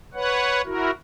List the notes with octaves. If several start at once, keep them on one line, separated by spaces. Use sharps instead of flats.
B4 C#5 F#5
E4 F#4 A#4